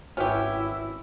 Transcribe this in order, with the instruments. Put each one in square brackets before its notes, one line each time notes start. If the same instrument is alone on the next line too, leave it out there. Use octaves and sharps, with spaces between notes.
[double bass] G#1 E4 [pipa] C#4 G4 [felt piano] F#4 B4 E5